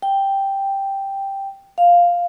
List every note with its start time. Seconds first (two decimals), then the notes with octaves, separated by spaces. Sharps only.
0.02 G5
1.78 F5